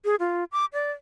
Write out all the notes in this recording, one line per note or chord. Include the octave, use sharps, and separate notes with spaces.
G#4
F4
D6
D5